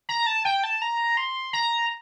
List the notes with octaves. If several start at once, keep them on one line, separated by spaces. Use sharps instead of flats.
A#5
A5
G5
A5
A#5
C6
A#5